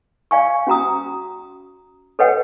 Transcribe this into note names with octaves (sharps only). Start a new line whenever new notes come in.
D5 F5 G#5 C#6
C#4 F#4 A#5 D#6
A4 B4 C#5 D#5 F#5 G5